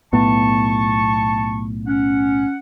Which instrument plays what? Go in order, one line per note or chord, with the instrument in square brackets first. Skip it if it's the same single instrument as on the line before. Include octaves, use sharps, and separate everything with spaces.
[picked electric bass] B1 A2 B3 [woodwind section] A5 C#6
[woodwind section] C#4 F#5